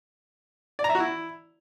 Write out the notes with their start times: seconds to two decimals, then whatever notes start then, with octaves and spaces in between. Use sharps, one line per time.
0.79 D5
0.84 A#5
0.90 E5
0.95 F#4
1.00 E4